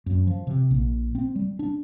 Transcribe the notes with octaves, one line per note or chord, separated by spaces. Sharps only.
F#2
F3
C3
A#1
C4
G3
D4